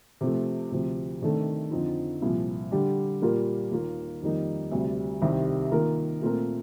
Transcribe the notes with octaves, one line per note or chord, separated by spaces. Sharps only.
C3 F3 A3
D2 C3 F3
C3 D#3 A3 D4 A4
F2 D3 F3 C4 D#4
C2 A#2 F3
D3 G3 D4 G4
A#2 G3 A#3 F4 A#4
D#2 D#3 A#3 F4
F2 D#3 G3 A#3 D#4
D2 C3 G3
C2 C3 D#3 G3 C4
D#3 A#3 F4 A#4
A#2 A3 C4 F4 A#4